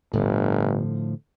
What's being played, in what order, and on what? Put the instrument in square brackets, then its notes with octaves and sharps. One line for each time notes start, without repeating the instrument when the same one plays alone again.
[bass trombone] G1 [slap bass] A2 D3 F3